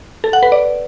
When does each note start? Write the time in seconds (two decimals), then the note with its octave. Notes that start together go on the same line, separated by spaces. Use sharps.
0.24 A4
0.33 F#5
0.43 B4
0.52 D5